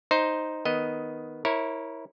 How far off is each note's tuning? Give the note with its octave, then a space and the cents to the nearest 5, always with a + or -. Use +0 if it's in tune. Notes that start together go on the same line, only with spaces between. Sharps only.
D#4 +0 C5 +0
D#3 +5 B3 +0 D#5 +5
E4 -20 A#4 +10 C#5 -15